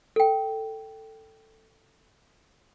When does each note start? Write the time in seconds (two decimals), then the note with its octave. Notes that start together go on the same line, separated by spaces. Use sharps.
0.16 A4 G5